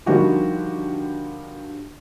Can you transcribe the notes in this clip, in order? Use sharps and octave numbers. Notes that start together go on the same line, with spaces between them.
D3 D#3 F3 G3 F#4 G4